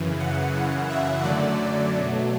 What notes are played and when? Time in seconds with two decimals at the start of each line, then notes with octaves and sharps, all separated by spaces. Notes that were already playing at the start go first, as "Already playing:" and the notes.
Already playing: F#2 C#3 E3
0.20 F#5
0.55 F#2 C#3 E3
0.90 E5
1.24 F#2 D3 F#3 A3 D5
1.93 B2 F#3 A3